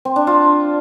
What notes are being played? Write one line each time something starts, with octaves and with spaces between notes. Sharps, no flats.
C4
D4
F4